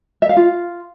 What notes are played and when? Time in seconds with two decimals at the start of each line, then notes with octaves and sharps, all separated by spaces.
0.22 E5
0.29 F5
0.37 F4